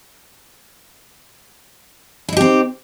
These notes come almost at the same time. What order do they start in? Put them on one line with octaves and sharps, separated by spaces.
E4 D#4 G4 C4